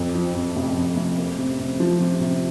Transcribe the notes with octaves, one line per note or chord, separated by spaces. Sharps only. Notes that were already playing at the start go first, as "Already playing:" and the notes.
Already playing: F2
F3
F2
F1
F2
F1
A#3
C3
C3
F3
C3
C3